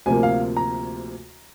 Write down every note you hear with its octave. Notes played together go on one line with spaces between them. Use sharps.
D2 C3 F3 A#3 G#5
F5
A#5